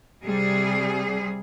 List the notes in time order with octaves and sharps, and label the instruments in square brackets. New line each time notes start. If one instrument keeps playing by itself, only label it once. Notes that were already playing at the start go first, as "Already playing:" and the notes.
[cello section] C3 G3 G#4